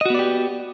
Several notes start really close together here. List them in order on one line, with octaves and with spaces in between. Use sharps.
D#5 F#4 B3 D5 G4